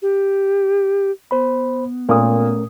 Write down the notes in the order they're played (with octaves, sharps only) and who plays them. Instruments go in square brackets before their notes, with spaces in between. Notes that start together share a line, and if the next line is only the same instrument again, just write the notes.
[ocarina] G4
[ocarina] B3 [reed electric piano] C5 B5
[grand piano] A#2 D#6 [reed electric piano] A3 C#4 A#4